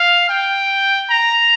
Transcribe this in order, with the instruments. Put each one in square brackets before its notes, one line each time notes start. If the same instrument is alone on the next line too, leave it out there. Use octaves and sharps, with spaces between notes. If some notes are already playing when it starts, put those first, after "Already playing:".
Already playing: [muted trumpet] F5
G5
A#5